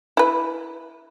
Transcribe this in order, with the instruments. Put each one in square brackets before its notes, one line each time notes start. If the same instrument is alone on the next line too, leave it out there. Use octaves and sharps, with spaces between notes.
[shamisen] E4 B4